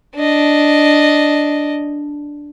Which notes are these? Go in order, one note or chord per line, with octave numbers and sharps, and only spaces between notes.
D4 D#5